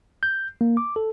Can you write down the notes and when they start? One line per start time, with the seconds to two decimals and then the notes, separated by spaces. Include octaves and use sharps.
0.23 G6
0.61 A#3
0.77 D6
0.96 A4